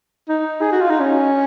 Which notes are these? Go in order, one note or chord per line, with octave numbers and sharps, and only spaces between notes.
D#4
G#4
F#4
F4
D#4
C#4